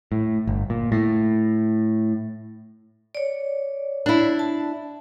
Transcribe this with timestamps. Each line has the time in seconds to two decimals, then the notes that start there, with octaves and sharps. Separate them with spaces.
0.12 A2
0.47 G1
0.70 A#2
0.92 A2
3.15 C#5 D5
4.06 D4 E4
4.39 A5